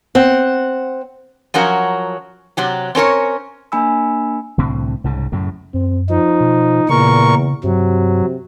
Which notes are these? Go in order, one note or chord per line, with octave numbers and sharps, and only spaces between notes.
C4 F#5
F3 F#3 C#4 F#4 A#4
C3 F#3 G4
C4 C#4 A#4 C#5
A#3 D4 G#5 B5 E6
C2 A2 D3 C4
C2 G#2 C#3
F#2 A2 C#3
F#2 C4
F3 D#4
B2
E2 A#2 C#3 A#4 C#6
G2 C3 F#3